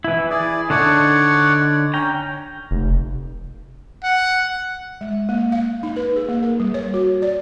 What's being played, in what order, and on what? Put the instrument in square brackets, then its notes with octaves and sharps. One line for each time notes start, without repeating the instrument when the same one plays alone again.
[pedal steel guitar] E3 E4
[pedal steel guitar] E4 [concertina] G#4 D5
[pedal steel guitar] D3 D4 D#4 [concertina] C#5 D5 F#5
[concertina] C#4 [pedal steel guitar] G5 A#5
[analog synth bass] F1
[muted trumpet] F#5
[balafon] G#3
A#3
F5
D#4
B4
G#4
A#3
A#4
G3
C#5
F#4
D5